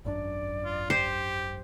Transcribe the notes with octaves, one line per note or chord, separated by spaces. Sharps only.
G#1 F#2 D4 D5
F4
G4 C5